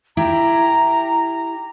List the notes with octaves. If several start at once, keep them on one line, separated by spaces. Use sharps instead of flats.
E4 G4 A#5